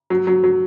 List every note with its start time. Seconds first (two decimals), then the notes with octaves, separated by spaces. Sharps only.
0.10 F#3
0.27 F#3
0.44 F#3